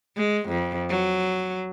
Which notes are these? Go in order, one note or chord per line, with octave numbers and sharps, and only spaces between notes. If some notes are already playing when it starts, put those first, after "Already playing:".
G#3
F2
F#3